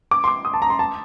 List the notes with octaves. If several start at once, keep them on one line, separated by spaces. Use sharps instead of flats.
D6
C6
D6
D#6
A5
A#5
C6
A5